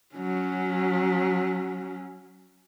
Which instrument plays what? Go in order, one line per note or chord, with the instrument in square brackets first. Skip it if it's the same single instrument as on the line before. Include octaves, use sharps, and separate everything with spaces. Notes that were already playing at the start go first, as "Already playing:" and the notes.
[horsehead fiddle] F#3 C#4